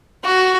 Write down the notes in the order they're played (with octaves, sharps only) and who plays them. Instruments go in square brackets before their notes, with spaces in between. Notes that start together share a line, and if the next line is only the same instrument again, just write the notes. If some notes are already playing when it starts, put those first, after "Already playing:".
[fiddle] F#4